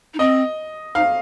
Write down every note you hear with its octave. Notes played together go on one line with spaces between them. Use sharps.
D#4
C4 D#5
D#4 F5